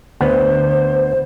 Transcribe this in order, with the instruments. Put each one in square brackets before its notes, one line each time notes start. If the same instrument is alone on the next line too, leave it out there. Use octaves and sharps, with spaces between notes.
[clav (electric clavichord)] D2 B3 F#5 [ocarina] C5